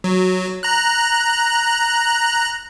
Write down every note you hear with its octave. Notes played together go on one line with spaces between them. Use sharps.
F#3
A#5 F#6